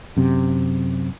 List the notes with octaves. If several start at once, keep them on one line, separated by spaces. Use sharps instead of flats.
F#2 C3